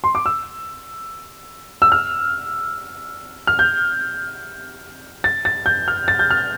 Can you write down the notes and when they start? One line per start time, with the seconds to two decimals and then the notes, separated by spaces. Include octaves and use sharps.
0.04 C6
0.15 D6
0.26 E6
1.82 E6
1.92 F6
3.47 F6
3.59 G6
5.24 A6
5.45 A6
5.66 G6
5.88 F6
6.08 A6
6.19 G6
6.30 F6